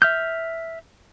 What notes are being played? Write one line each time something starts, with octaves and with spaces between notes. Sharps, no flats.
E5 F6 G6